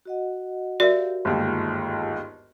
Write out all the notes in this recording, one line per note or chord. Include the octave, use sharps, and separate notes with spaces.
F#4 D#5 F#5
F#4 G4 A#4 D5 E5 F5
G1 D#2 G#2 D#4 F4 G#4